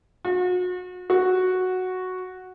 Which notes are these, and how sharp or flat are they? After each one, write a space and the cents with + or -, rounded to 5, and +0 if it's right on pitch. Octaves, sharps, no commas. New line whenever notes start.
F#4 -40
F#4 -5